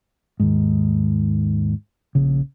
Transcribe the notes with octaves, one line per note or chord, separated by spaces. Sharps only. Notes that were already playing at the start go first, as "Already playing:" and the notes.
D#2 G#2
A#1 C#3